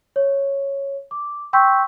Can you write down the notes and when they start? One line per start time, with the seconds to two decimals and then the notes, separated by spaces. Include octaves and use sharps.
0.16 C#5
1.11 D6
1.53 G5 C6 C#6 E6 G6 B6